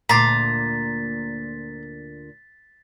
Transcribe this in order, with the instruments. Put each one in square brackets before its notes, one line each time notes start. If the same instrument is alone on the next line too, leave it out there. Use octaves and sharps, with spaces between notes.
[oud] D2 A#2 [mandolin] A#5 C6 D6 [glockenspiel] A6 B6